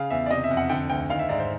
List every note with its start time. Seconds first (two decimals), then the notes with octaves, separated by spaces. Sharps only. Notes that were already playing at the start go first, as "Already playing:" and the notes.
Already playing: C#3 F5
0.10 E2 E5
0.26 D5
0.31 C3 D#5
0.44 E5
0.51 F2
0.57 F#5
0.70 D3 G5
0.90 D2 G5
1.10 D#3 F5
1.19 E5
1.29 G#2 D5
1.39 C5